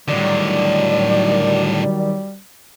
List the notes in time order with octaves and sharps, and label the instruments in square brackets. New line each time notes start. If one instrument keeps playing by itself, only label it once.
[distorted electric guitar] A2 D3 [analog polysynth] D#3 F#3 [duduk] G3 [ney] D5